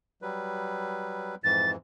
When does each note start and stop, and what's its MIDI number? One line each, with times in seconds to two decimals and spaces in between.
0.22 1.35 54
0.22 1.35 55
0.22 1.35 71
1.44 1.76 41
1.44 1.76 44
1.44 1.76 52
1.44 1.71 93